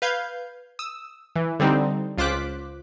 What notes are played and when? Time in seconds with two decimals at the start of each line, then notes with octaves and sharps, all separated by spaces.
0.02 B4 F5 G6 G#6
0.79 D#6 E6
1.36 E3
1.60 D3 G3 C4 D#4
2.17 C#2 F4 C5 D6 F#6 B6